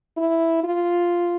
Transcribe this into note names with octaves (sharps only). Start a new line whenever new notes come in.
E4
F4